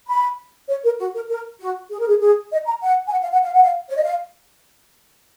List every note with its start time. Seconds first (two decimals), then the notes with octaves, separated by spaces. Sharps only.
0.08 B5
0.68 C#5
0.84 A#4
0.99 F#4
1.14 A#4
1.29 A#4
1.60 F#4
1.90 G#4
1.99 A#4
2.08 G#4
2.21 G#4
2.51 D#5
2.66 A#5
2.82 F#5
3.08 G#5
3.12 F#5
3.22 F5
3.32 F#5
3.43 F5
3.53 F#5
3.63 F5
3.89 C#5
3.96 D#5
4.03 F5